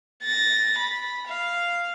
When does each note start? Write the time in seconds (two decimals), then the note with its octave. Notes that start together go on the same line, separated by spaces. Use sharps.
0.23 A6 A#6
0.79 B5
1.28 F5